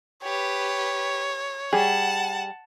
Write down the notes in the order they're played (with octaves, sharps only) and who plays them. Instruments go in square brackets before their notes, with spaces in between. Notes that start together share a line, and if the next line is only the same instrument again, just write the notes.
[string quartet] G4 B4 [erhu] C#5
[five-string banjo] G3 G#4 [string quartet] F#5 A5